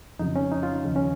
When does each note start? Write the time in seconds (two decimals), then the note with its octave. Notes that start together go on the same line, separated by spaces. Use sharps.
0.19 F2 C#3 F#3 D#4
0.36 C#4
0.52 D#4
0.63 F4
0.84 D#2 C#3 F3
0.96 C#4